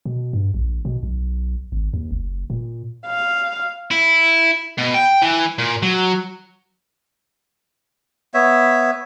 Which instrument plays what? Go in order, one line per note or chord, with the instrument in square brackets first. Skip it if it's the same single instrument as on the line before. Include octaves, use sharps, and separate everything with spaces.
[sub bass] B2
G2
A#1
B2
B1
G#1
D#2
F#1
A#2
[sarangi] F5
[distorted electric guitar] E4
B2
G5
E3
A#2
F#3
[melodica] B3 C#5 E5